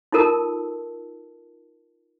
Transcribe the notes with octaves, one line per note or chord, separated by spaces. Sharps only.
D#4 F4 A4 A#4 A5 E6